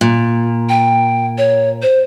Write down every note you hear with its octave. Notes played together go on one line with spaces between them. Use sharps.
A#2
G5
C#5
C5